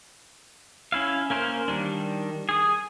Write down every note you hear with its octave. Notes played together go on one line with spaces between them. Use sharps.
C#4 E4 F5
A#3 C#4 A#4 C5
D#3 G3 D4
G#4 D#6